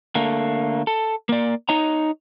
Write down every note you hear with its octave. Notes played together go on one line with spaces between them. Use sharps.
D3 A3 A#3
A4
A#3 D5
D#4 C#5 D#5 A#5